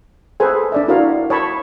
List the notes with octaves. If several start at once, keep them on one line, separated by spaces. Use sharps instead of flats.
G#4 A4 B4 C5 G#5
D4 D5 E5
E4 F#4 A#4 C#5 F5
C#5 A5 B5 C#6